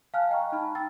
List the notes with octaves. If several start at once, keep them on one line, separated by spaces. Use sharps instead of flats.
F5 G#5 A5 F6 F#6
D#5 G5 A#5 C#6
D#4 A5 B5 F6
G5 E6 A6